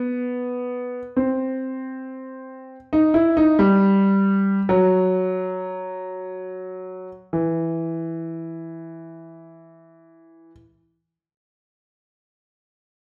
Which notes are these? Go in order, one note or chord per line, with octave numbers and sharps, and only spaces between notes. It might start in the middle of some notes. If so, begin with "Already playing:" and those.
Already playing: B3
C4
D#4
E4
D#4
G3
F#3
E3